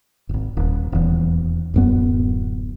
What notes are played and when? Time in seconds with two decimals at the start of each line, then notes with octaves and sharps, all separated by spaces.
0.29 D#1 G#1
0.57 D#1
0.92 D#1 E2
1.74 D1 F#2 B3